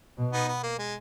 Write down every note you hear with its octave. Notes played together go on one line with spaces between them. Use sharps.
B2
B3 D#4
B3
A#3
G#3